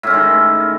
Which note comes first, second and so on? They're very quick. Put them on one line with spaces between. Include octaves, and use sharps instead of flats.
A2 C#4 G#3 D#3